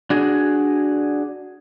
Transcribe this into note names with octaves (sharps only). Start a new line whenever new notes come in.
D4 F#4 G#4